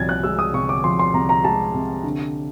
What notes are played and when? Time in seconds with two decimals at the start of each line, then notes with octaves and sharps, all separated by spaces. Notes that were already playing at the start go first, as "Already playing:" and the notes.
Already playing: C2 F3 G#6 A6
0.09 F#6
0.23 G#3 E6
0.39 D#6
0.53 C3 C#6
0.69 D6
0.84 F3 C6
0.99 C6
1.13 C2 A#5
1.29 A#5
1.44 G#3 A5
1.74 C3
2.04 D3